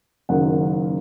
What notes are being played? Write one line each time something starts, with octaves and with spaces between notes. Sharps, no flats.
F#1 F#2 D#3 F#5